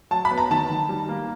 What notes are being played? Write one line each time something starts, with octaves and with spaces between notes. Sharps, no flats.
F#3 A5
B5
B3
A#5
D#3 A5
D#3
G3
A#3